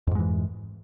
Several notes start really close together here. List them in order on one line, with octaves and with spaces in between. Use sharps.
F2 G#2 G#3 E3